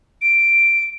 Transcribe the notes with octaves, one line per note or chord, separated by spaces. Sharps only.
D7